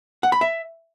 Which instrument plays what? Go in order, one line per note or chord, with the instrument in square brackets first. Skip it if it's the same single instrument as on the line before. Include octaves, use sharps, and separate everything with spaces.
[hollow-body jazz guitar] F#5
B5
E5